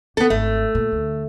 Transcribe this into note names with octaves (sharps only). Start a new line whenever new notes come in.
D#3 A#3 B3 A4
G#1 A3
A#2
D2